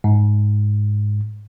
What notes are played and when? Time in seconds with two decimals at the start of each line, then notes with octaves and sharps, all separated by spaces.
0.04 G#2